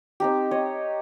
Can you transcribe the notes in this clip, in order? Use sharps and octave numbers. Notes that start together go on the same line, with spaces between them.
C4 D#4 G4
C#5 D#5